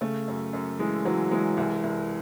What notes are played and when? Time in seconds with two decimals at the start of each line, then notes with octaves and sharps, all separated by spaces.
0.01 C#3 A3
0.28 F#2
0.53 F#2
0.79 E3 G#3
1.05 E3 F#3
1.31 E3 G#3
1.57 C2
1.84 C2